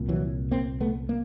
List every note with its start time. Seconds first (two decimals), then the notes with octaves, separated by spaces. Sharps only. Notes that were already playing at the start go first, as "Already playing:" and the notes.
Already playing: C2 A#2
0.09 E3 F#3
0.51 A#3 C4
0.81 A3 B3
1.09 A#3